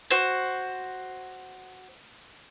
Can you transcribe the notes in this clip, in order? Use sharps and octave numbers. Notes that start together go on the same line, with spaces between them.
F#4 C5